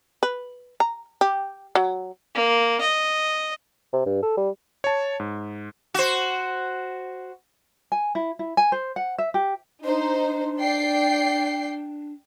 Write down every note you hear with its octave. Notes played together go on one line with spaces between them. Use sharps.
B4
A#5
G4
F#3
A#3
D#5
C3
G2
A4
G3
C#5 A5
G#2
F#4 C5
G#5
E4
E4
G#5
C5
F#5
E5
G4
D4 D#4 C5
D5 G5 C7